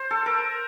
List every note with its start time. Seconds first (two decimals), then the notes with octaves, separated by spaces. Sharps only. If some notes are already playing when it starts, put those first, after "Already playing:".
Already playing: C5
0.11 A4
0.26 A#4